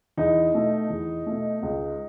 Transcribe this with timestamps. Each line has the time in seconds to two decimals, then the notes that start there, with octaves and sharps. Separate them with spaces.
0.17 E2 D#4
0.54 B2 A3
0.90 E2
1.26 B2 A3
1.63 C#2